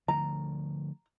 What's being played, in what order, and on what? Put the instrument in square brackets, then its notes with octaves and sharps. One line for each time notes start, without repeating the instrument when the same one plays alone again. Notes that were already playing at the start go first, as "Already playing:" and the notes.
[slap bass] D3 F3 A3 [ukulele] A#5